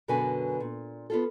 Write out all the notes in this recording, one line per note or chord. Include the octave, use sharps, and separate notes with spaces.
F#2 B2 D3 F#4 B4 G#5
A#2
B3 F4 A4